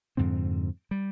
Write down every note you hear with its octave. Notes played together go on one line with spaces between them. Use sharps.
F2 G#2 D3 C4
G3